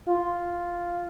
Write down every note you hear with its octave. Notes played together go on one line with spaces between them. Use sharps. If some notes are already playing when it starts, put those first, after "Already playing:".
F4